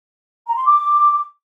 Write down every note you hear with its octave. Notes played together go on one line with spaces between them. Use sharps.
A#5
C6
D6